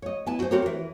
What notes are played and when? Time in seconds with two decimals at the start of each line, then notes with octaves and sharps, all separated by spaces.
0.02 C#5 D#5
0.26 B3 E4 G#5 A5
0.39 F#4 C5
0.51 C4 F#4 G4 A#4 C5 C#5
0.62 E3 A#4